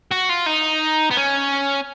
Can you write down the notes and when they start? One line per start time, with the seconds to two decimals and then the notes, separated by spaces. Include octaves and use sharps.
0.11 F#4
0.29 F4
0.46 D#4
1.11 B3
1.17 C#4